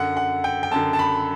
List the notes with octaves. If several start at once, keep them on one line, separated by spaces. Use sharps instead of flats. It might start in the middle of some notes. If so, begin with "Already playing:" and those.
Already playing: F#2 D3 F#5
F#5
G5
G5
F#2 D3 A5
A5
B5